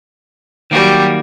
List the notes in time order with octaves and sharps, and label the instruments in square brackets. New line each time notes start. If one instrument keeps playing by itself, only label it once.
[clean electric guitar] D#3 A#3 F#4 [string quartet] F#3 G3 G4